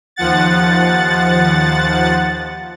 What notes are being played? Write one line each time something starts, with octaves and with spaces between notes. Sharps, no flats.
D#2 F3 F#5 A6